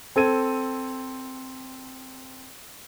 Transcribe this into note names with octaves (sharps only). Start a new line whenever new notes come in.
C4 A4 G#6 D#7